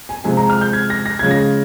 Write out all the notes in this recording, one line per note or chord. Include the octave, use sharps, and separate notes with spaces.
G#5
C3 F3 G#3 G#5
A#5
F6
G6
G#6
A#6
A#6
C#3 F3 G#3 G#6
A#6